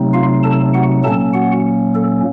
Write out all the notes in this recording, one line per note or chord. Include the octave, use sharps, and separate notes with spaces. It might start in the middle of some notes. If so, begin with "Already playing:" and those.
Already playing: C3 F#3 A3 C4 D#4
F4 F5
A4 A5
F#4 F#5
A#2 F#3 A#3 C#4 A4 A5
F#4 F#5
A4